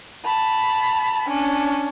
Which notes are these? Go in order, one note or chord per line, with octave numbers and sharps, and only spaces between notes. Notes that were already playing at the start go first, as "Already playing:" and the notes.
A5 B5
C#4 D4